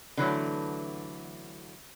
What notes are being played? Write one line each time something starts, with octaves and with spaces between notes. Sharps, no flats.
D3 E3 F#3 A3